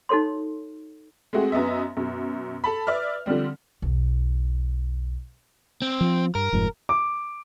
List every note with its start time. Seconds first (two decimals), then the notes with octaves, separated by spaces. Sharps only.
0.09 D#4 F#4 A4 C#5 C6
1.33 G#3 A3 C4 F#4 G#4
1.52 F#2 B3 D#5 E5
1.97 F#2 B2
2.64 A4 A5 B5
2.87 B4 D5 E5 F6
3.26 D3 F3 G3 C4
3.82 B1 E2
5.82 C4
6.01 F3
6.35 G2 A#4
6.53 F1 F2 G#2
6.89 D6